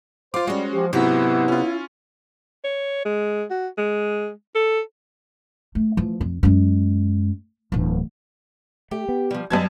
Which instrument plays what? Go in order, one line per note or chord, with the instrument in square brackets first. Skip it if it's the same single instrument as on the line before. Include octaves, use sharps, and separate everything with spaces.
[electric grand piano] F4 D6 [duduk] C5 [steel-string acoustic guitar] F5
[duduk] G3 [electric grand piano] G#3 F#4 [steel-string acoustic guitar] C#4 C5
[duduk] F3 [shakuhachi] G4
[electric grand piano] G#2 F#3 F#4 [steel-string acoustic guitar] C3 G4 [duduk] B3 [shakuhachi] E4
[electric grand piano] C#4 F4
[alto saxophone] C#5
G#3
F#4
G#3
A4
[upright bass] A3
E3 F3
F2
F#2 G#3
D1 E2
[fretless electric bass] A3 [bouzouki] G4
[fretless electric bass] B3
[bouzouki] F3 G3
[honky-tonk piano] F#2 A5 G#6 [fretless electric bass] F#3 G3 [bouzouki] A4 B4 D#5